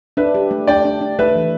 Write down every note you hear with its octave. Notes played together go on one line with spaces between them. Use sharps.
D4 B4 E5
G4
A3
D4 D5 G5
D4
D4
A3 B4 E5
E3